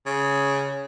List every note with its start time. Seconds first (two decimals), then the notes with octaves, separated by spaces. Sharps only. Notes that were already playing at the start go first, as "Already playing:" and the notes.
0.06 C#3